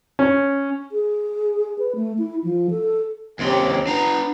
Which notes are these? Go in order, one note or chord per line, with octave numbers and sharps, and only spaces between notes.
C#4
G#4
B4
A3
E4
F3
A4
D#2 C4 C#4 G4
B3 D4 A#5